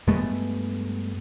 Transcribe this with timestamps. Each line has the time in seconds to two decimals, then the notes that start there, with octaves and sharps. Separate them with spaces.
0.07 G2 G#3 A3 B3